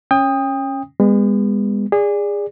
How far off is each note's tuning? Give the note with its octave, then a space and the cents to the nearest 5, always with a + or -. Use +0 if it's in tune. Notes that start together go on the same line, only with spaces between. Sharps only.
C#4 -15 G5 +30 D#6 +0
G#3 -40 B3 +0
G#4 -25 D5 +0